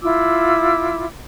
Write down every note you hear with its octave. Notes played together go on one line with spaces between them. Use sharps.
E4 F4 D6 E6